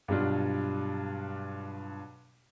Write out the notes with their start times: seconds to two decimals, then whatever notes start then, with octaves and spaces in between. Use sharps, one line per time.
0.08 G2 B2 F#3 G3 D4 F4